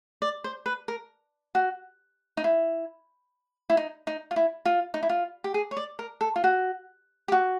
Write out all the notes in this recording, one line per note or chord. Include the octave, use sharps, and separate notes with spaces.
D5
C5
B4
A#4
F#4
D#4
E4
E4
D#4
D#4
F4
E4
F4
D#4
E4
F4
G4
G#4
C#5
D5
A#4
A4
F4
F#4
G4
F#4